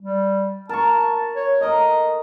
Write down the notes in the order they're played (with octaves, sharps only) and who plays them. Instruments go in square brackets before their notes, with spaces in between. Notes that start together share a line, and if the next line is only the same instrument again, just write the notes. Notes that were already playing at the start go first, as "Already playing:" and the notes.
[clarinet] G3
[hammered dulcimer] A#4 C#6 [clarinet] A5
[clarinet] C#5
[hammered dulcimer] A4 A#4 [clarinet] D#5